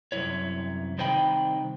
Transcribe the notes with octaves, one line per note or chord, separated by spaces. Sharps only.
C2 F#2 E4 C#5
C2 D#3 C5 D#5 G5 B5